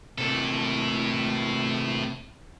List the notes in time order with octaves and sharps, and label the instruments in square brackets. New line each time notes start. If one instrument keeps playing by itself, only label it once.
[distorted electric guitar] A2 A4 [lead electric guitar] C3 A#3